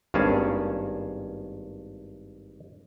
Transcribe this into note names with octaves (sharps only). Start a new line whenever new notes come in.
G#1 G2 A#3 C#4 G#4 A5